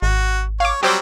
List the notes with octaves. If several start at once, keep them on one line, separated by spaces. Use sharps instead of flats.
G#1 F#4
C#5 F5 D6
F#3 G3 C4 G4 C5 D6